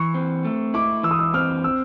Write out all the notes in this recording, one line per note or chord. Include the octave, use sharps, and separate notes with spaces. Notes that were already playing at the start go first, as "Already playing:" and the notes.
Already playing: E3 C#6
C4
A3
E4 D6
E3 E6
D#6
E6
C4 F6
E6